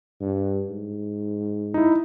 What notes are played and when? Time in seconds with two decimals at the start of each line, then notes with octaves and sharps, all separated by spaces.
0.21 G2
0.70 G#2
1.74 D#4 E4